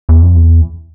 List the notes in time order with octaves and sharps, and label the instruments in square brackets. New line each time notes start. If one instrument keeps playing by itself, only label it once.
[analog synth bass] E2
F2
E2